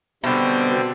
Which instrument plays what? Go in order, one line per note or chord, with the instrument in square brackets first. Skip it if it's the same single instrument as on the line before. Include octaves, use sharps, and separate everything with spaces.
[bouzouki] B2 [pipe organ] D3 G3 C4